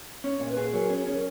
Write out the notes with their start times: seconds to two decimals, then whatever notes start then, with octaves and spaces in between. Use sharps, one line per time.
0.24 C#4 C#5
0.40 A#2
0.49 B4
0.57 G#4
0.73 F#3 A#4
0.90 C#4
0.98 G#4
1.07 C#4
1.13 A#4